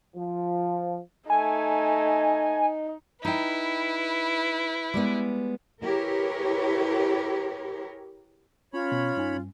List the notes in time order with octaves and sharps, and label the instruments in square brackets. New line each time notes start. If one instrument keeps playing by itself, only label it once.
[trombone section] F3
[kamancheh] A3 [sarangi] D#4 [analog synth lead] G#5
[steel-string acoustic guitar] D#4 G5 [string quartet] E4 B4
[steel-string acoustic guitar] G3 G#3 B3
[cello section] E4 G4 G#4 A#4 B4 C#5
[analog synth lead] C#4 [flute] F4 [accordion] C#5 B5
[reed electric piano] B2
[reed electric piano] G2 D#4 G#5 [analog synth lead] C#4
[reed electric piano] G2